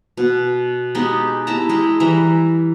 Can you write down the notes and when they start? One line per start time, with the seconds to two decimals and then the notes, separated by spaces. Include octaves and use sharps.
0.17 B2
0.95 G#3 B3 D#4 G4
1.47 E4 G4 A5 A#5
1.69 G#3 E4
2.00 E3 G3 E5 A#5